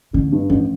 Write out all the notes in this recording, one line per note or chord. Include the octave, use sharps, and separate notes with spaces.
A1 D3
G2
A1 F3